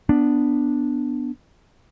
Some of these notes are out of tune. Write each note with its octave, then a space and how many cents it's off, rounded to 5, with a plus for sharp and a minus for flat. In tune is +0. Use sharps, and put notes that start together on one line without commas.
B3 +0 D4 +0